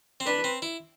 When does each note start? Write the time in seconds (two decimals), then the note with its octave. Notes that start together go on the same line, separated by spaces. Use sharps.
0.20 C4
0.26 D4 B4
0.44 C4
0.62 E4